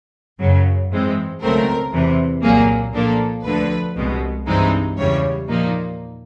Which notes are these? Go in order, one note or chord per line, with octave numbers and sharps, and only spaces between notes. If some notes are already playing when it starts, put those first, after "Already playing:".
F#2 C#3 F#3
G#2 E3 G#3 C4
C#2 B2 F#3 A3 C4 A#4
E2 C3 E3
C2 A#2 F#3 A#3 G#4
A#2 F3 A#3 D4 A4
D2 D3 F3 B4
C2 B2 G#3
G2 E3 G#3 C4 D#4
E2 C#3 E3 G3 C#5
A#2 F3 A#3 D#4